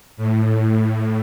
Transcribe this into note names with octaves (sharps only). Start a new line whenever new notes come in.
A2